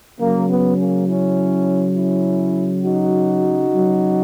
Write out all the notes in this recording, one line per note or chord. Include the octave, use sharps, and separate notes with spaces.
C#3 F#3 A#3
B3
A#3 C#4
C#4 E4
C#4 E4
D#4 F#4
C#3 F#3